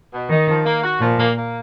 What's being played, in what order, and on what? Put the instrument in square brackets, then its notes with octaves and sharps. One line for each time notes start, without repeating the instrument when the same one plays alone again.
[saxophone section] B2
[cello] D#3 [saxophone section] D#4
[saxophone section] F3
A#3
F#4
[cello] A#2 [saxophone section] F3
[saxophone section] A#3
A#3